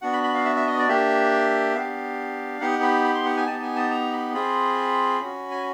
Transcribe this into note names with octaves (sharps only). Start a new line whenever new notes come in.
B3 D4 F#4 F#5
B5
B5
F5
E5
E5
D#5
D5
A#3 D4 G4 E5
B3 D4 G4 F5
B3 D#4 G4 F#5
B5
B5
C6
F#5
G#5
B3 D#4 G4 A5
G#5
A5
A#5
B5
C4 F4 G#4 B5
C#4 F#4
G#5